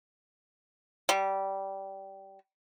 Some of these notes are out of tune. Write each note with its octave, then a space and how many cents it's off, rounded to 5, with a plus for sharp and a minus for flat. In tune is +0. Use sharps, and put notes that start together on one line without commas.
G3 -15